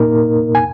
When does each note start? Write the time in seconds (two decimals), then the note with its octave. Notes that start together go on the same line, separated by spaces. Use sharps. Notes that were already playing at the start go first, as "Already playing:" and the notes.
Already playing: A#2 A#3 D#4 A#4
0.55 G#5